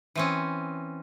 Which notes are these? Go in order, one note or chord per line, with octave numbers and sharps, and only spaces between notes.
E3 C4 C#4